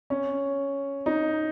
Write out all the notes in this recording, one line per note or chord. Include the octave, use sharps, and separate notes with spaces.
C#4
D#4